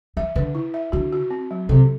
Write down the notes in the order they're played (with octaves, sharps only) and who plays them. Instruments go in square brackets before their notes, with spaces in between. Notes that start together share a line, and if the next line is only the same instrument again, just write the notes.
[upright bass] E3 [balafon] E5
[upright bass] D3 [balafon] B4
[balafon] E4
E5
[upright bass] D3 [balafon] F#4
[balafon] F#4
C4
F#3
[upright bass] C3 [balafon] A4